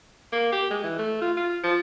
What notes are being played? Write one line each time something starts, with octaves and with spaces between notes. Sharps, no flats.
A#3
G4
G#3
E3
A3
F4
F4
F3